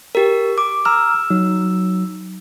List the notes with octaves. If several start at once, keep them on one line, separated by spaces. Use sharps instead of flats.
G4 A#4
D6
A#5 E6 F6
F#3 D#4